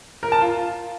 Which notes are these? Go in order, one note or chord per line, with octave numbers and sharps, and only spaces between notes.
A#4
A5
F4